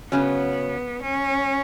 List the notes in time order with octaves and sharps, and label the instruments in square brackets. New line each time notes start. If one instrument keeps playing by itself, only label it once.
[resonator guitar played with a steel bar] C#3 F#3 C#4 [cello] B3
[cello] C#4